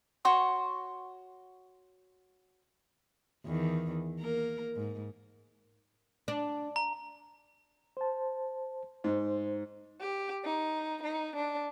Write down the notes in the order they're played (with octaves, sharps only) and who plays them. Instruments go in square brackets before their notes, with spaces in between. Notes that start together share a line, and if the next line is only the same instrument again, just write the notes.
[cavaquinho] F#4 C#5 C6 C#6
[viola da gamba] E2 D#3
A#3 A#4
G#2
[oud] D4
[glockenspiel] A#5
[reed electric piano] C5 A5
[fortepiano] G#2 [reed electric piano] C5
[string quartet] G4
D#4
D#4
D4